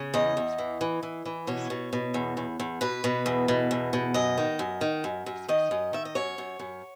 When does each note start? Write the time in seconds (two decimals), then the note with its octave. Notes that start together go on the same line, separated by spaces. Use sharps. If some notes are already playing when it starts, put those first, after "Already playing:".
Already playing: C#3
0.14 E2 D#5
0.37 E2
0.58 E3
0.81 E3
1.03 E3
1.25 E3
1.47 B2 C#5
1.70 B2
1.93 B2
2.14 E2
2.37 E2
2.60 E2
2.81 B2 B4
3.04 B2
3.26 E2
3.48 B2
3.71 E2
3.93 B2
4.14 F#2 D#5
4.38 D#3
4.59 F#2
4.81 D#3
5.04 F#2
5.26 F#2
5.48 D#3 D#5
5.71 F#2
5.93 D#3 E5
6.05 D#5
6.15 F#2 C#5
6.38 F#2
6.59 F#2